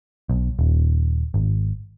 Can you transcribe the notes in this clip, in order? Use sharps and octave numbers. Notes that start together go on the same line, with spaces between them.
B1
D#1
G#1